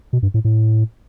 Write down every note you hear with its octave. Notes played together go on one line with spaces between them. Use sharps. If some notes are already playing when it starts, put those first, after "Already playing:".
B2
G2
A2
A2